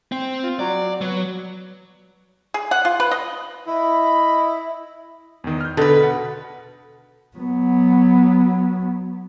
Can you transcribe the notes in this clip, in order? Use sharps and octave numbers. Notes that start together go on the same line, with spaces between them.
C4
F4
F#3 D5
F#3 B3
G#4
F#5
F4
B4
D#5
E4 D#5 B5
E2 D#3
F6 G6
B2 D3 A4 B4
F#5
F#3 B3